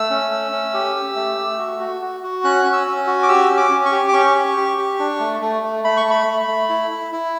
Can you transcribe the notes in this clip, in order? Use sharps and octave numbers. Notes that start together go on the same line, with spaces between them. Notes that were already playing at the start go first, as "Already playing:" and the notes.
Already playing: A3 E6
C#4
A3
C#4
G4
G4
A3
A3
F#4
F#4
F#4
F#4
C#4 F#6
C#4
E6
C#4
F#4
D6
G4 E6
C#4
D6
C#4
C#6
G4
D6
C#4 C#6
G4
G4
G4
D4
A3
A3
A3
A3 B5
C#6
A3
B5
A3
A3
E4
E4
E4